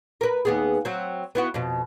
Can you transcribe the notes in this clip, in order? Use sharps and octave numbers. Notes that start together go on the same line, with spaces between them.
A#4 B4
D#2 B3 G#4
F#3 C4
B3 E4 F#4
F2 B2